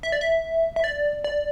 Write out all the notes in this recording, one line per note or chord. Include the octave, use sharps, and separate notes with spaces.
E5
D5
E5
E5
D5
D5